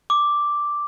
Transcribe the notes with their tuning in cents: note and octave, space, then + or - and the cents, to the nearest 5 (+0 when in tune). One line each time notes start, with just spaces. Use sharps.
D6 +0